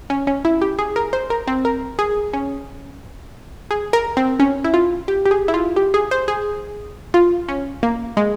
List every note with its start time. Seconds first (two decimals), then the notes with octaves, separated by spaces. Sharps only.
0.10 C#4
0.27 C#4
0.45 E4
0.62 G4
0.79 G#4
0.96 A#4
1.13 C5
1.30 A#4
1.47 C4
1.65 A#4
1.99 G#4
2.33 C#4
3.71 G#4
3.93 A#4
4.17 C4
4.40 C#4
4.64 E4
4.74 F4
5.08 G4
5.26 G4
5.31 G#4
5.48 E4
5.54 F4
5.76 G4
5.94 G#4
6.11 C5
6.28 G#4
7.14 F4
7.49 C#4
7.83 A#3
8.17 G#3